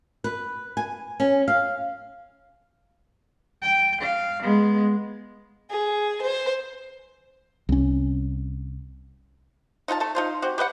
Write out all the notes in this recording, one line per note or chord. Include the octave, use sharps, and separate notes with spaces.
B4
G#5
C#4
F5
G5
F5
G#3 B3
G#4
C5
C2 C#4
D#4 F4 F#5 A5
A3 A4 A5
D#4 F4 C5
C4 F#4 G4
G4 B4 D#5 F#5